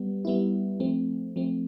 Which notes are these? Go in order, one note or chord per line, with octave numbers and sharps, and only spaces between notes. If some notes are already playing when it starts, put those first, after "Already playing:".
Already playing: G3 B3
G3 B3 E4
F3 A3 C4
F3 A3 C4